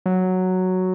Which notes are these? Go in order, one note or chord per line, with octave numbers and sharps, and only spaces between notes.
F#3